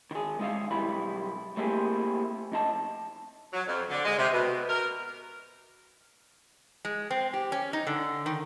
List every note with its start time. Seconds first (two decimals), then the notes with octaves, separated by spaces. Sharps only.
0.11 D#3 G#4
0.39 G#3 D#4 E5 F5
0.71 B1 E3 G3 E4 B5
1.57 A3 A#3 C4 E4 G4 G#4
2.52 F2 D#4 A5
3.53 F#3
3.67 F2
3.89 D3
4.05 G#3
4.18 C3
4.32 B2
4.68 A#4
6.85 G#3
7.11 C4
7.33 G4
7.52 C#4
7.73 D#4
7.87 D3
8.26 D#3